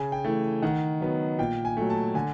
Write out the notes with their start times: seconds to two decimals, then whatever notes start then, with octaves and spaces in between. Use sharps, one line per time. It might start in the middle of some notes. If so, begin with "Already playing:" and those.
Already playing: C#3 G#5
0.12 G5
0.25 E3 A3
0.62 D#3 F#5
1.01 F#3 B3
1.39 A#2 G5
1.65 G#5
1.77 F#3 A3
1.90 A5
2.14 D3 G#5